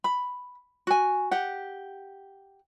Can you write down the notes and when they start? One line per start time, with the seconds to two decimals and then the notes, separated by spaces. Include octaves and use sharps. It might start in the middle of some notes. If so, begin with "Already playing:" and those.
0.04 B5
0.87 F#4 G#5
1.31 G4 F#5